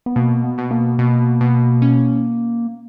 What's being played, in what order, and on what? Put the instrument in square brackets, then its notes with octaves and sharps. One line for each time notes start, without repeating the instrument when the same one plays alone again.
[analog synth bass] B3
[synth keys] B2 [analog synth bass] A#3
[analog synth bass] B3
[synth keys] B2
[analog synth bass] A#3
[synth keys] B2
B2
C#4